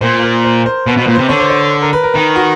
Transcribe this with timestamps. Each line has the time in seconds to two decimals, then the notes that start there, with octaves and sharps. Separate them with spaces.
0.01 A#2 C5
0.22 A#4
0.45 C5
0.66 C5
0.87 B2 B4
0.97 B2
1.02 C5
1.07 A#2
1.15 C3 C5
1.29 D3 C#5
1.40 C5
1.50 C#5
1.61 C5
1.82 A#4
1.93 B4
2.04 A#4
2.14 D#3 A#4
2.36 F#4